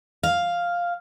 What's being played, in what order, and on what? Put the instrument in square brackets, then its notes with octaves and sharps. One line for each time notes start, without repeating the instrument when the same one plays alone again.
[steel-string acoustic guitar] F5